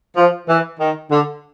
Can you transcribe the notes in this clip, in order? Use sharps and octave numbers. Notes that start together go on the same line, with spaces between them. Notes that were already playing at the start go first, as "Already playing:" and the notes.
F3
E3
D#3
D3